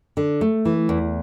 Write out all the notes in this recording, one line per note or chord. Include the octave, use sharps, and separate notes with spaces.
D3
A3
E3
E2